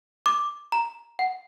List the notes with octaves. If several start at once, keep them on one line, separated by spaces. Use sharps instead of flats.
D6
A#5
F#5